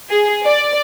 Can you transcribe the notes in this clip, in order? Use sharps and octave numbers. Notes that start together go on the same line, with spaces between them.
G#4
D5